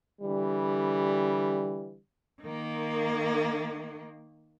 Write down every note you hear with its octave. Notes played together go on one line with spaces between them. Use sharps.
D3 E3 G3
D#3 A#3